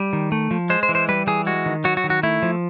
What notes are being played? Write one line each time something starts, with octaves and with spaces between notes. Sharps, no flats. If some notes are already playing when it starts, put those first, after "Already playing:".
Already playing: G3
D#3
A3
F3
G#3 C5
C5
E3
C5
G3 B4
E3 G#4
G#3 F#4
D#3
F#3 F#4
F#4
D#3
F#4
A3 E4
F3